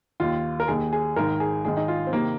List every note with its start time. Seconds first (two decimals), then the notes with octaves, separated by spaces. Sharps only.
0.20 D#2 D#3 F4
0.60 A#4
0.68 D#2 D#3 G#4
0.93 G#4
1.16 G#1 G#2 D#3 A#4
1.40 G#4
1.65 G#1 G#2 D#3 G#4
1.77 D#4
1.88 F4
2.07 C4
2.13 C3 D#3 A#3